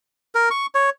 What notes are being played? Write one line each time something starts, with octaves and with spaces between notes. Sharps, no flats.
A#4
C#6
C#5